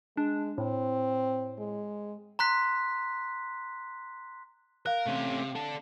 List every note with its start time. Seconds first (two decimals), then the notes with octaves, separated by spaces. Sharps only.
0.17 G#3 D4
0.58 A2 C4
1.59 G#3
2.39 A#5 C6 F#6 B6
4.86 A#4 F5 F#6
5.06 C3 A3 C#4
5.55 D4 A4